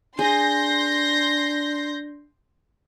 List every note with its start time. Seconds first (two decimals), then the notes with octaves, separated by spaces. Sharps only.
0.19 D4 G#4 C6 G6 A#6